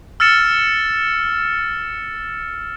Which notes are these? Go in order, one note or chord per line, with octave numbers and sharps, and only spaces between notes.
E6 F6 A6 C#7 E7